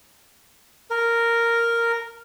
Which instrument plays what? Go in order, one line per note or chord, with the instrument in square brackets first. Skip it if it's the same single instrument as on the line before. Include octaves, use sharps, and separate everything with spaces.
[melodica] A#4